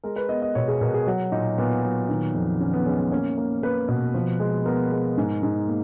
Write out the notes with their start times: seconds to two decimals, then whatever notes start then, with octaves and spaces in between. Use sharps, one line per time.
0.04 G#3 A#4
0.16 B4
0.29 B3 D#5
0.42 D#5
0.55 B2 C#5
0.68 G#4
0.81 B2 A#4
0.94 G#4
1.07 F#3 F#4
1.32 A#2 D#4
1.58 A#2 B3
1.83 F#3
2.09 D#3
2.35 F2
2.60 D#3 C#4
2.73 B3
2.86 G#3 C#4
3.00 B3
3.12 A#3 C#4
3.38 A#3
3.63 A#3 B4
3.88 B2
4.14 F3
4.40 G#3
4.66 B3 A#4
4.92 G#3
5.18 G#2
5.43 G#2
5.68 A#3